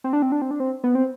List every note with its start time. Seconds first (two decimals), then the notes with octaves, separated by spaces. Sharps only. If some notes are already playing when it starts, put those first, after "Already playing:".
0.04 C4
0.13 D4
0.22 C4
0.32 D4
0.42 C4
0.51 D4
0.60 C4
0.84 B3
0.95 C4